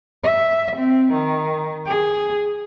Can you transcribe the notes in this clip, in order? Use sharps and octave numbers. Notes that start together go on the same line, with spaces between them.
E5
C4
D#3
G#4